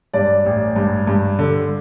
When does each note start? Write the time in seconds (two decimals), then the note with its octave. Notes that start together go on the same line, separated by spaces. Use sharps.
0.14 G2 D5
0.45 A1
0.76 G2
1.07 G2
1.39 D3